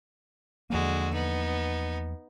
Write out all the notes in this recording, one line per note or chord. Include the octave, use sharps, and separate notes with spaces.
E2 D3 F3 G#3 A#3 F#4
B3 D#4